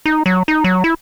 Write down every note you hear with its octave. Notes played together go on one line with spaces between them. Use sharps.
D#4
F#3
D#4
F#3
E4